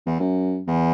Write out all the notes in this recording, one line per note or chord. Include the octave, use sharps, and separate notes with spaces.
E2
F#2
E2